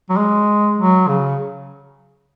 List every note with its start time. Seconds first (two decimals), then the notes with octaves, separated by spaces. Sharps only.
0.09 F#3
0.17 G#3
0.78 F#3
1.08 C#3